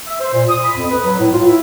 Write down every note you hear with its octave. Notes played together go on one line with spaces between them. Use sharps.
E5
C5
A#2
D#6
B5
F2
B4
F#3
A2
F4
E4